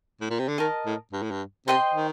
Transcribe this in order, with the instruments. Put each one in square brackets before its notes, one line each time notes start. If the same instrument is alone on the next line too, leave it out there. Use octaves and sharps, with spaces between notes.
[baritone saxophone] A2
A#2
C3
D3
[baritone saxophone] D#3 [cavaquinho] A#4 D#5 A5
[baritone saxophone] A2
G2
A2
G2
[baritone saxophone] C3 [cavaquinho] C5 D#5 G5 C6
[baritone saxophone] D#3